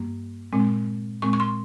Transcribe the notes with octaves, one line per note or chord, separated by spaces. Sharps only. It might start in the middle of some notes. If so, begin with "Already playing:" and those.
Already playing: G2 G3 A#3
A#2 G#3 C4
A#2 G#3 C4 C#6
C#6
C6